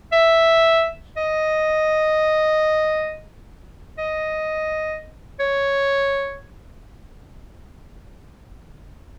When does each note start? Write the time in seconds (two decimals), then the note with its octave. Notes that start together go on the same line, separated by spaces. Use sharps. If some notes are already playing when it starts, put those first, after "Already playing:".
0.12 E5
1.17 D#5
3.98 D#5
5.40 C#5